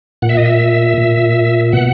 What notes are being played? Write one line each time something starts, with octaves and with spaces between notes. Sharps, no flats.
A#2 F#5
E5
D#5
E5
A#2
B2 F#5